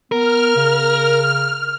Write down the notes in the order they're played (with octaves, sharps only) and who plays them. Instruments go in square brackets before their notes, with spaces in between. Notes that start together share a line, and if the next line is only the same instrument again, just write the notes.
[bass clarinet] B3 [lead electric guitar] A#4 [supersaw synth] F6
[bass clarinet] C#3